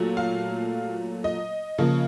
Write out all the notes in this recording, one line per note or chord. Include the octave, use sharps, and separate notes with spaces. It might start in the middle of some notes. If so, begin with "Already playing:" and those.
Already playing: A#2 F#3 A3
F5
D#5
C#3 F3 A#3